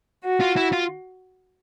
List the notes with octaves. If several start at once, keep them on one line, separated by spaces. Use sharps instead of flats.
F#4
F4
E4
F4